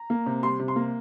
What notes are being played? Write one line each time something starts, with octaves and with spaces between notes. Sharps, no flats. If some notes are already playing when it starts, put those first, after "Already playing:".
Already playing: A#5
A#3
C3
G3 C6
C3
C6
A#3